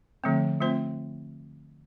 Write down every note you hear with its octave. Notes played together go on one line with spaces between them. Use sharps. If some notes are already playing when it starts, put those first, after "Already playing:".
D3 F3 A3 C4
A3 C4 F4 C5